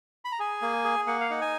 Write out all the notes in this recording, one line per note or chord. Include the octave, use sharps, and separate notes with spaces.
B5
A#5
G#4 G#5
A#3
G#4
A#3 F#5
F5
D#4 F#5
G#5